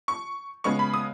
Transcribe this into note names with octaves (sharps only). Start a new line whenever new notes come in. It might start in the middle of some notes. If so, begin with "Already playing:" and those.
C#6
C#3 G#3 B3 C#6
B5
D#6